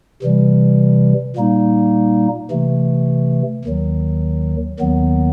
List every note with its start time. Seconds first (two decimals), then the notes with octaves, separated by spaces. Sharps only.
0.22 C3 E3 G3
1.37 A#2 G3 A#3 D#4
2.51 C3 E3 A3
3.65 D#2 D#3 F#3
4.80 D#2 D#3 F#3 B3